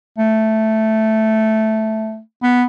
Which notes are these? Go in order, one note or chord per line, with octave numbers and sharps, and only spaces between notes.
A3
B3